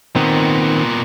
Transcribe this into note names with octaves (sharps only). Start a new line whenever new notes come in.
A#2 D#3 B3 C4